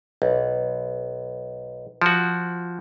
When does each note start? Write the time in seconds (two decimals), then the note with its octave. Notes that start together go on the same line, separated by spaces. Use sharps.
0.22 B1
2.02 F3 F#4